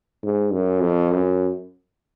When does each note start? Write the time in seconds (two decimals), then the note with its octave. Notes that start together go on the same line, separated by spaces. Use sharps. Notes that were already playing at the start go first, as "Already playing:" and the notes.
0.23 G#2
0.52 F#2
0.82 F2
1.11 F#2